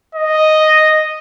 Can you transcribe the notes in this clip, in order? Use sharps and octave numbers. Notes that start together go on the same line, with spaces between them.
D#5